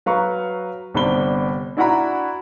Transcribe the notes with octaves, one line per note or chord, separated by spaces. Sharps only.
F#3 B4 F5 A#5 C#6
G1 C3 D4 C5 B5 G7
D4 E4 F#4 F#5 A#5 B5